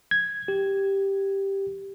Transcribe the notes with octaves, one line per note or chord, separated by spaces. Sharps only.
G#6
G4